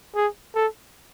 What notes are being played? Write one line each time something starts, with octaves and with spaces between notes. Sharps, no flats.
G#4
A4